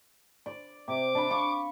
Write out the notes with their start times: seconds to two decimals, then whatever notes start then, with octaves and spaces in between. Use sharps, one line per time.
0.46 D5
0.88 C3 D6
1.15 D4 B5
1.30 F5 C#6